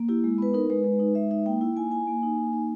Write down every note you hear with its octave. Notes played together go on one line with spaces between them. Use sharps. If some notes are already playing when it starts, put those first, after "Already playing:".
Already playing: A#3
E4 G4
G#3
B3 B4
D#4 A#4
G#3 B4
G#3
D#4
G#3 E5
D#4 E5
A#3 G5
E4
A#3 G#5
E4 G#5
A#3
D#4
A#3
D#4